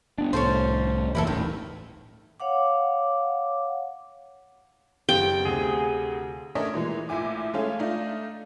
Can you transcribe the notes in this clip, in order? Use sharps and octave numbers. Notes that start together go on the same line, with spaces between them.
B3 D4
C2 A2 C#4 A4 C5
F#1 E3 A#3 E4 F4 A4
D#1 A1 A2 D#3
C#5 F5 F#5 D6
F#1 B3 G4 F5 G5
D2 C3 G#4
A3 C#4 D4 A#4 C#5 D#5
A#2 E3 G#3
A#1 A2 E4 G#5 D6
G#3 A3 C#4 A4 F5
A3 D4 D#4 F4